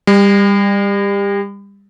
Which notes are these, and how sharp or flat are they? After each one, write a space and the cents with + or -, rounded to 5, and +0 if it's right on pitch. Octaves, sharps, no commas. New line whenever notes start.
G3 +30